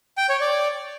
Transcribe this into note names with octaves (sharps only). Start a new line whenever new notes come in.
G5
C#5
D5